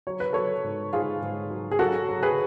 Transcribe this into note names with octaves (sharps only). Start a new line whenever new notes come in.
F#3 C#5
B4
F#3 A4 C#5
G#2
G#2 F4 G#4
G#2
F#3
G#4
F#3 F#4 A4
F#3
G#4 B4